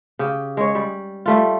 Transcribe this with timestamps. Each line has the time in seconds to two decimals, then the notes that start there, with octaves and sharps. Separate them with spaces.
0.19 C#3 G4
0.57 G#3 C#5
0.75 G3
1.26 G3 A3 F4